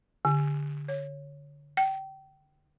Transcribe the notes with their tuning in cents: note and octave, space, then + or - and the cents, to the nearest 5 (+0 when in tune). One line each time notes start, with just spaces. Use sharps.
D3 -15
C#5 -5
G5 -25